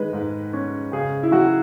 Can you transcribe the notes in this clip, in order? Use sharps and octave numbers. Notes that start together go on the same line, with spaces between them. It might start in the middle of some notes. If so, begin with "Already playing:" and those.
Already playing: D#3 G#3 B4
G#2
C#4
C#3 G#4
E4
F#3 F#4